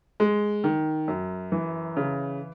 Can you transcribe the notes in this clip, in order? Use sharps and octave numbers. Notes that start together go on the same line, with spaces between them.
G#3
D#3
F#2
E3
C#3